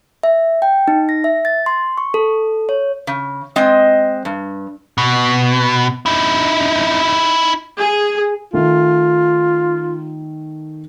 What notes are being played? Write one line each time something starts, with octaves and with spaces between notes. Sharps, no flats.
E5
G5
D#4
A#6
E5
A6
C6
C#6
A4
C#5
C#3
G#3 C4 D#5
G2
B2
D#4 E4
G#4
D#3 A3 F4